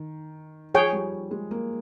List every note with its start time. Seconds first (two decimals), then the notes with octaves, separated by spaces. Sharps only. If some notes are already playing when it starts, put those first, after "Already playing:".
Already playing: D#3
0.74 F3 G#4 C#5 G5
0.93 G3
1.31 G#3
1.51 A#3